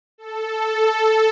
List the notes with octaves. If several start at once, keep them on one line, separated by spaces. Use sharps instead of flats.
A4